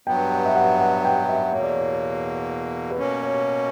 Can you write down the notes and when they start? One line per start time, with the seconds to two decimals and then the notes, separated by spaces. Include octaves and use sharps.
0.07 G2 F#3 B3 G5
0.31 G5
0.45 E5
0.56 F#5
0.81 F#5
1.05 G5
1.29 E5
1.52 E2 B2 A#3 C#5
1.63 D5
1.73 C#5
2.91 B4
2.98 B2 A#3 C#4 C#5
3.23 C#5